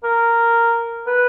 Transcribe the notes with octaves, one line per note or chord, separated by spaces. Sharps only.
A#4
B4